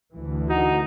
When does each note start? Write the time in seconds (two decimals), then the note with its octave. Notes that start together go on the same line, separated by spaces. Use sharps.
0.12 D2 E3
0.50 D#4 F#4